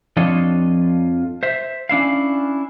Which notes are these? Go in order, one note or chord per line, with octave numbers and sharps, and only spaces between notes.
F2 F3 D4 F4 C#5 D#5
C5 E5
C#4 D4 E4 F5